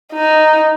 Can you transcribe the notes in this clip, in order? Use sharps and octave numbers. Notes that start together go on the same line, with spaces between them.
D#4